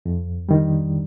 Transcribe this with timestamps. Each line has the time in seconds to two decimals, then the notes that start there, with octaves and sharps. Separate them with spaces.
0.06 F2
0.49 D#3 G3